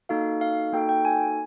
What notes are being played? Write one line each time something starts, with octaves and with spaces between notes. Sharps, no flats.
A#3 D#4 F#4 A4 F5
F5
A#3 D#4 F#4 A4 G5
G5
G#5